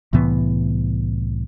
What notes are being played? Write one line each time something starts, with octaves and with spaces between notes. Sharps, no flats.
C2 A2 E3 B3